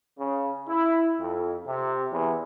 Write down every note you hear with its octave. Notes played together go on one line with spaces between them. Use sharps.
C#3
E4
F2
C3
E2